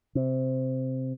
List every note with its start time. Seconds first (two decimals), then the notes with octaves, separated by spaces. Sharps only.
0.15 C3